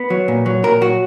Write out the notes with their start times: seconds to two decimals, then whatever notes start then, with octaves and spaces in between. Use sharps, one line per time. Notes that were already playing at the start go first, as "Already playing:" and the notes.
Already playing: B3
0.10 F#3
0.28 A#2
0.46 F#3
0.64 A#2 A#4
0.81 F#3 F#4